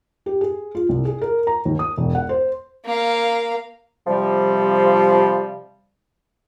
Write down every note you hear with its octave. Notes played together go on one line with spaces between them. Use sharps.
G4
G#4
F4
C2
G#4
A#4
A#5
D#2
D#6
E1
F#5
C5
A#3 F5
C3 F3 G3